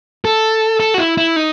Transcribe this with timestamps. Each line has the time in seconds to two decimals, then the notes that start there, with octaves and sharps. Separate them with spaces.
0.25 A4
0.80 A4
0.94 F#4
0.98 E4
1.17 E4
1.36 D#4